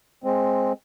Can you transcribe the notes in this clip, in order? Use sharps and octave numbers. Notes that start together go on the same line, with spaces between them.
G#3 C4